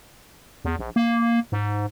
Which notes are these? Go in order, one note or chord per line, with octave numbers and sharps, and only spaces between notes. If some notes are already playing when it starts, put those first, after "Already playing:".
E2
A#1
A#3
G#2